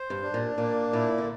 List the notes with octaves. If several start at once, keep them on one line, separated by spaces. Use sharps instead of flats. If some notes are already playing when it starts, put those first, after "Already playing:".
Already playing: C5
G2
D4
A#2
A#2 A#3
A#2 E4
D3